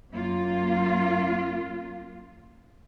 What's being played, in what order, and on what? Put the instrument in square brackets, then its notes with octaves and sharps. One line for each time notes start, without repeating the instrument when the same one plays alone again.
[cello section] F#2 A#3 F4